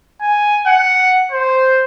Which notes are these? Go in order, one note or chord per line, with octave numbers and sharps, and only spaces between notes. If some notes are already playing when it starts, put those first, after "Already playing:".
G#5
F#5
C5